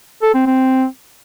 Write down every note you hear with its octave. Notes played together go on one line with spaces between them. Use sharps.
A4
C4
C4